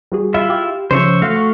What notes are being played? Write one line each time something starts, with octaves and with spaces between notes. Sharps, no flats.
G3 F#4 G#4
E4 F4 E5
G4 F5
C#3 F3 C5 C#5 E5
A3 F#4 F5
C#6